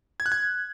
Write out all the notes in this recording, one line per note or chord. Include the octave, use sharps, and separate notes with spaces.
G#6
F#6
G#6